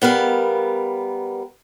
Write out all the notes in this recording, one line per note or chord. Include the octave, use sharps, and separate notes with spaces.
G3 B3 A#4 F5